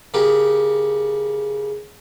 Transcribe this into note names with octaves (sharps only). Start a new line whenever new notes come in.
C#3 G4 A#4